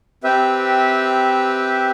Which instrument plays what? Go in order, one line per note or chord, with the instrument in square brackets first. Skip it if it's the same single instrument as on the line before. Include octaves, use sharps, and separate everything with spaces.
[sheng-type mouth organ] C4 G4 B4 E5